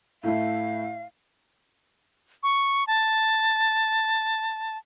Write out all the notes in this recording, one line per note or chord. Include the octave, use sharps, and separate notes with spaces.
A2 A3 E4 F5
C#6
A5